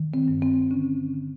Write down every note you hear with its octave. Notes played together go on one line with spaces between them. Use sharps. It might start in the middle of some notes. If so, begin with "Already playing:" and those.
Already playing: D#3
C4
G2
C4
D3 C#4
D3